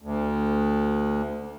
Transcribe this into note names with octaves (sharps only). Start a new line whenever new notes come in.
D2